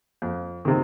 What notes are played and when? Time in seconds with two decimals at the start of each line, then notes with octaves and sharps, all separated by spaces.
0.22 F2
0.65 C3 D#3